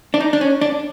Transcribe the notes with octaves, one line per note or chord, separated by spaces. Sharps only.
D4
D#4
D4
C#4
D4